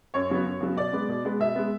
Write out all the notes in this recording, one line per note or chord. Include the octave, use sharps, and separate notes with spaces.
F#2 C#5
C#3 F#3 B3
F#2
C#3 F#3 B3
B2 D5
G#3 B3
B2
G#3 B3
B2 E5
G#3 B3